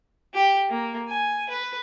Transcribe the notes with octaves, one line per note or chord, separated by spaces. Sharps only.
G4
A#3
G#5
B4